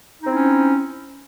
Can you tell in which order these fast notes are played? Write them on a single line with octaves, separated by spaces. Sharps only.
D#4 C4 E4 C#4